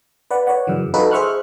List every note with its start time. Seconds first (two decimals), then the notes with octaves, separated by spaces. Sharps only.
0.31 B4 D5 F#5
0.47 B4 C#5 D5 F#5
0.67 F#2 C#3 E3
0.94 D#4 F4 F#4 A4 B4
1.11 G#4 C5 E5 C#6 F6 F#6